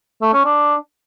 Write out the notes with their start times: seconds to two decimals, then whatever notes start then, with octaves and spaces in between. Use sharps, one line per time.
0.22 A3
0.33 C#4
0.45 D4